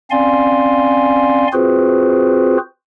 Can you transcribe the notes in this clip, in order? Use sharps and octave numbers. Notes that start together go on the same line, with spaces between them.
C4 C#4 D5 F5 G#5 C6
C4 F4 F#4 G#4 B4 C5